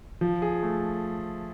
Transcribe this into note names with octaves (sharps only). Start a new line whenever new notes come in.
F3
G#4
A3